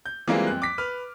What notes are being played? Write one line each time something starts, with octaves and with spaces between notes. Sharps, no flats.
G6
E3 G3 G#3 A#3 C4 F4
F2 F#6
D6 B6
B4 F6